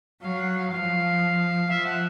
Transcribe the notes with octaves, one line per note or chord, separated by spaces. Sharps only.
F#3 F5
F#5
F5
F3 F5
F3 E5
F#5